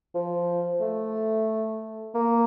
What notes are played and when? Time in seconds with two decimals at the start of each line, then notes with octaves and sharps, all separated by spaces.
0.14 F3
0.81 A3
2.14 A#3